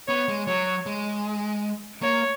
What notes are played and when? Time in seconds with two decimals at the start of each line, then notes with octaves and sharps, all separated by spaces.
0.08 B3 C#5
0.28 G#3
0.47 F#3 C#5
0.86 G#3
2.02 A#3 C#5